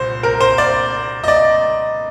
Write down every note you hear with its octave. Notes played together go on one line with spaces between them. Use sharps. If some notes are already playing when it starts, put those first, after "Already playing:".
Already playing: C2 A#2 C5
A#4
C5
D5
D#5
D5